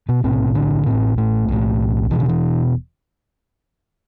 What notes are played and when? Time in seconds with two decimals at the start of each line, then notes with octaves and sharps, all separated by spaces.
0.09 B2 B3
0.23 B1 A2 C3 C4
0.55 D3 D4
0.86 A2 C3 C4
0.91 A1
1.18 A2 A3
1.49 B1 A2
2.11 E1 E2 B2 E3
2.20 D3
2.29 E3